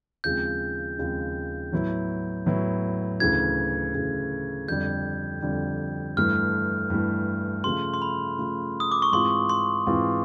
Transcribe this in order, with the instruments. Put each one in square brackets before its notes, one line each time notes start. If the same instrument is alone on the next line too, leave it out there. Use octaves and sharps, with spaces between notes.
[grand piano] D#2 C#3 F3 G#3 C4 [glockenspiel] G6
[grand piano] D#2 C#3 F3 G#3 C4
A2 F#3 B3 E4
A2 F#3 B3 E4
[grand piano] D2 C#3 E3 [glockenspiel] G#6
[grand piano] D2 C#3 E3
[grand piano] F2 D3 G3 [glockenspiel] G6
[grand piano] F2 D3 G3
[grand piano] G2 E3 A3 [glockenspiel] F6
[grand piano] G2 E3 A3
[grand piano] C#3 F3 A3 [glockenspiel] C6
[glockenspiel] C6
B5
[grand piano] C#3 F3 A3
[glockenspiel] D#6
D6
C#6
[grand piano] G#2 E3 G#3 C4 F4 [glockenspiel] C6
[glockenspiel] C6
[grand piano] G#2 E3 G#3 C4 F4